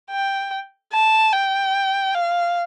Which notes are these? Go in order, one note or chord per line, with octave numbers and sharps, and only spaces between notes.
G5
A5
G5
F5